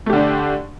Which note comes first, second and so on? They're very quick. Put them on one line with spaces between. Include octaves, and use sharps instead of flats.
A3 G4 D3 D4